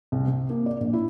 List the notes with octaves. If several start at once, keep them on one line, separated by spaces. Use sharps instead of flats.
C2
C3
A#3
D5
A#1
E4